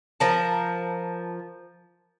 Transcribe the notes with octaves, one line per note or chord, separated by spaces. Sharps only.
F3 A#4 A5